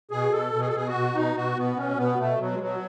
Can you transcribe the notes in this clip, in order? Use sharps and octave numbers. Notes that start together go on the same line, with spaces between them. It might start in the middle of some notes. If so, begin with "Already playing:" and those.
B2 G#4
B2 A4
B2
G#4
A4
B2 G#4
F#4
B2
B2 D#4
B2 F#4
B2 B3
B2 C#4
B2 B3
B2 A3
B2 F#3
G#3
B2 F#3